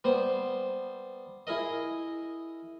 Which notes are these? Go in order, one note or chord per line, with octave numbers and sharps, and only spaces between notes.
G3 B3 C5
E4 G#4 A#4 D#5